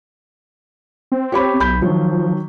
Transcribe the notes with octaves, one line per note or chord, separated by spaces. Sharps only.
C4
G4 C#5 B5
B1 B5 G6
D#3 F3 F#3